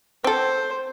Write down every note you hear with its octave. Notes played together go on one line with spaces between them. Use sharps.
C4 A4 C5